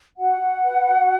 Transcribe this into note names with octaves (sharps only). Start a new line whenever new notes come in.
F#4 F#5
F#4
B4
F#4